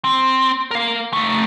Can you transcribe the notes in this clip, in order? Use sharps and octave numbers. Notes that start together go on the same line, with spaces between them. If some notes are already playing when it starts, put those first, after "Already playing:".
C4
A#4 F5
A3 D#4